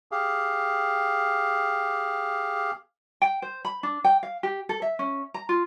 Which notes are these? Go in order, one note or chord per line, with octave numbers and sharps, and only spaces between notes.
G4 G#4 F5
G5
C5
B5
D4
G5
F5
G4
A4
E5
C#4
A#5
F4